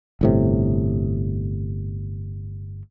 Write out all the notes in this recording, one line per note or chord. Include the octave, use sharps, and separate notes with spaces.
G1 A2 C3